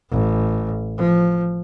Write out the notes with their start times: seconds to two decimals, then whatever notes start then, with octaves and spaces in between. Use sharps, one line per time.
0.11 A1
0.98 F3